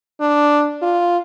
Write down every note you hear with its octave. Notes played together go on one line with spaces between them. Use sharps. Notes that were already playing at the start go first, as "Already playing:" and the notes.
D4
F4